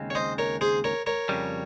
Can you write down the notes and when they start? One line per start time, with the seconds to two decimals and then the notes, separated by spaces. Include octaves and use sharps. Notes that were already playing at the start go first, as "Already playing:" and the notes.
Already playing: D#2 C#3 G#3 C4
0.10 C#5
0.15 C5 D#5
0.38 A#4 C#5
0.61 G#4 C5
0.84 A#4 C#5
1.06 A#4 C#5
1.29 F2 C#3 G3